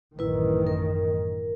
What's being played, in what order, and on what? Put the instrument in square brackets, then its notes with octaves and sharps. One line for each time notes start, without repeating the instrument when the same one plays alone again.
[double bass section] A1 F#2 D#3 [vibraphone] E4 B4
[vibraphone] A#4